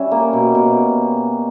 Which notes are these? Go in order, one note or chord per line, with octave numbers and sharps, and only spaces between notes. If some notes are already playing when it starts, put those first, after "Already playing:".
Already playing: G3 C#4 E5
A#3
B2
B2